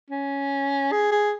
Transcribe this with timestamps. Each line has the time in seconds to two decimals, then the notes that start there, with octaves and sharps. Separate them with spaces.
0.10 C#4
0.92 G#4
1.12 G#4